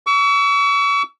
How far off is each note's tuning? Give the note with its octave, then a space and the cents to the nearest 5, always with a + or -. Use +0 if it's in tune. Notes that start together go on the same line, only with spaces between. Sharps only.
C#6 +40 E6 +0